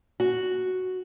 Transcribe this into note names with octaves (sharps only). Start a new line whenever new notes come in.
F#4